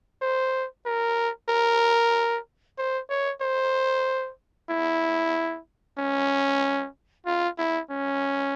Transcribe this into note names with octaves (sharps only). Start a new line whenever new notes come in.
C5
A#4
A#4
C5
C#5
C5
E4
C#4
F4
E4
C#4